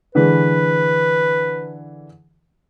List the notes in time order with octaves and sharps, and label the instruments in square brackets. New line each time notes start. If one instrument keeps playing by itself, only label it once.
[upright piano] D3 E3 G#3 [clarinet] B4